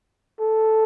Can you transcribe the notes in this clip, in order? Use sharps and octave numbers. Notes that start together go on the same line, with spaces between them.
A4